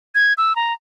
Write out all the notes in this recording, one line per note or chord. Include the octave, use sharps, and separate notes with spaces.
G#6
E6
A#5